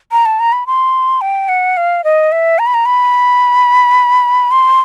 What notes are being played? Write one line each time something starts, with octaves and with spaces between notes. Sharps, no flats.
A#5
A5
A#5
B5
C6
G5
F#5
F5
D#5
E5
A#5
B5
A#5
B5
C6